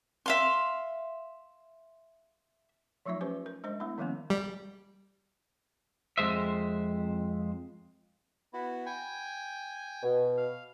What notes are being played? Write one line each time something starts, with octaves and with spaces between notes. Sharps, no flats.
E5 F5 C6
F3 F#3 A3 D#4 F4 E5
C#4 G4 B4 C5
A#4
G#3 D4 C5 D#5
A3 B3 D4 E4
D#3 F3 G3 A#3 B3 C#4
G3
F2 C3 G#3 C5 E5
B3 E4 F#4
G5 G#5
B2
F5